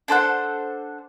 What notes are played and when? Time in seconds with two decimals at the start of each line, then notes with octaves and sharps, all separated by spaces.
0.08 D4 A4 C5 F#5